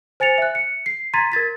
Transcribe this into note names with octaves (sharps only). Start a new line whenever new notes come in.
C5 G#5 A6 C#7 F7
E5 F#6
C#7
C7
A#5 C6 G#6 A6 B6 D#7
A#4 G#6 A6 B6